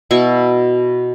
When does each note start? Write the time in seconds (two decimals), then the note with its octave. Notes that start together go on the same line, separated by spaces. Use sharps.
0.11 B2 E4 C#6